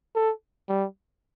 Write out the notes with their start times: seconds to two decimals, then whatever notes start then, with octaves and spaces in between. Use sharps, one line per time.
0.15 A4
0.69 G3